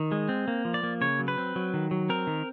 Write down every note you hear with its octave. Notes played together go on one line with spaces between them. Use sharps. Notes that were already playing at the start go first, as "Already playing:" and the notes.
Already playing: D#3
G#3
C4
A#3
F3
D5
A#3
C#3 C#5
F#3
B4
C4
F#3
D#3
F#3
C4 A#4
D#3